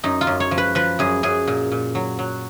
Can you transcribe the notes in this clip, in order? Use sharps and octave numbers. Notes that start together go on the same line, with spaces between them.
F#2 D#4
F4
F#2
C#5
F3
B4
F3 B4
F#2 G#4
F#2 G#4
A#2
A#2
F#3
F#3